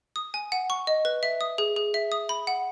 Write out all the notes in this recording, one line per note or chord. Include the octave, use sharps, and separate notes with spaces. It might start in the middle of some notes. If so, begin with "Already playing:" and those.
D#6
G#5
F#5
C#6
D#5
B4
E5
D#6
G#4
G#4
E5
D#6
B5
F#5